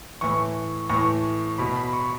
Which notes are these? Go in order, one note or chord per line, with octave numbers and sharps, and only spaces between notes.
A2 E3 C#6
A2 E3 C#6
B2 B5
B5
C#6